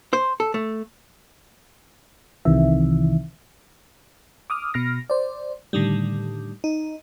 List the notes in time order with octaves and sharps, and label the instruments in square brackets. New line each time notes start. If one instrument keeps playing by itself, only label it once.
[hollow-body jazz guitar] C5
A4
A3
[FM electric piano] C2 C3 D#3 E3 E5
D6 D#6 F6
B2 F6 A#6
C5 D5
A2 D3 D#3 G3
D#4